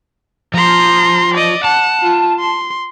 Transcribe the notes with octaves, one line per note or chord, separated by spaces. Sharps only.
F3 A#5 C6
D5 D#5
F#5 A5
F4
C6